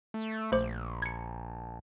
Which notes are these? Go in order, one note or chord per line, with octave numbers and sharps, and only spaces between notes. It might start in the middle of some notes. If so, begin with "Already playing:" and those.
A3
A#1 A3 C5 D6
G#6 C#7